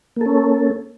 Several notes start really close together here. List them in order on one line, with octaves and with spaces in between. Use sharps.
A#3 A4 C#4